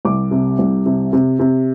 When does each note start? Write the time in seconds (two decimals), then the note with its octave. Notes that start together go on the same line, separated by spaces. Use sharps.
0.05 C2 D6
0.31 C3
0.59 C2
0.86 C3
1.13 C3
1.39 C3